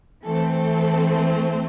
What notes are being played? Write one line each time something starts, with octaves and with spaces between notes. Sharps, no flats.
E3 A3 C4 A4